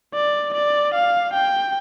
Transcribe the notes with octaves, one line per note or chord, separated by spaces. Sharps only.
D5
D5
F5
G5